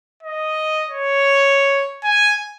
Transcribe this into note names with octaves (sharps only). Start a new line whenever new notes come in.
D#5
C#5
G#5